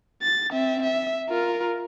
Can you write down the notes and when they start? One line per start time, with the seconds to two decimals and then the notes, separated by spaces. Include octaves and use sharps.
0.22 A6
0.52 C4 E5
0.83 E5
1.29 F4 A#4